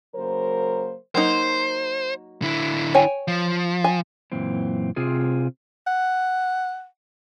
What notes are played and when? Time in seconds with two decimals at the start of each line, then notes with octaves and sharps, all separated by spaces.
0.15 C#3 F#3 A#3 A#4 C5
1.15 F#3 A#3 D#4 C5
2.42 D3 E4
2.95 C#5 G5 G#5
3.28 F3
3.84 G#5
4.32 F#2 A#2 E3 C4
4.96 C3 C4 F4 G#4
5.87 F#5